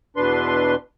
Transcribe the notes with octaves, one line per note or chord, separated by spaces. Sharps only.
E2 B2 D4 B4 C6